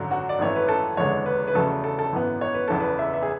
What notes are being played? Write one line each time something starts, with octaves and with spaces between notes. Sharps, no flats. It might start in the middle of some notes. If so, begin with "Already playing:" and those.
Already playing: G#1 F#2 D3 F#3
F#4
D5
G#1 F#2 E3 A3 C#5
B4
A4
F#1 E2 D3 G#3 C#5
B4
B4
E2 C#3 F#3 A3 A4
A4
A4
G#1 F#2 E3 B3
C#5
B4
F#1 E2 C#3 E3 A4
B4
E5
E5
G#4